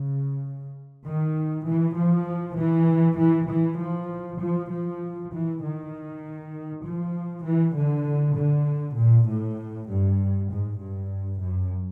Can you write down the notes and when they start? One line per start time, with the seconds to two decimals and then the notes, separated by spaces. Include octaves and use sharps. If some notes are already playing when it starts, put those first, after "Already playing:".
Already playing: C#3
1.06 D#3
1.66 E3
1.97 F3
2.57 E3
3.18 E3
3.48 E3
3.80 F3
4.40 F3
4.71 F3
5.32 E3
5.63 D#3
6.84 F3
7.45 E3
7.75 D3
8.36 D3
8.97 A#2
9.28 A2
9.88 G2
10.50 G#2
10.80 G2
11.42 F#2